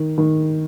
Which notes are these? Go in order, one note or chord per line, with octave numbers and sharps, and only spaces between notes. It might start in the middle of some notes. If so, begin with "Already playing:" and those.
Already playing: D#3
D#3